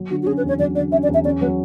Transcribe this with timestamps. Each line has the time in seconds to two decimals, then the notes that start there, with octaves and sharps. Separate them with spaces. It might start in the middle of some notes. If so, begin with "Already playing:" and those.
Already playing: F#3
0.10 D3 F#4
0.22 F#4
0.26 C#4 G#4
0.37 B4
0.43 E2
0.48 C#5
0.59 F#3 D5
0.75 D3 D5
0.92 C#4 E5
1.03 D5
1.09 E2
1.14 E5
1.25 C#4 D5
1.41 F#3 B4